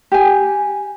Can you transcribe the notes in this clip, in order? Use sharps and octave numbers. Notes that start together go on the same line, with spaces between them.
G4 G#5